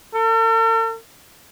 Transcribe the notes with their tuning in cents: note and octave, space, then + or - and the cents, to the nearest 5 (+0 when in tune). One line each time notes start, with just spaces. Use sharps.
A4 +45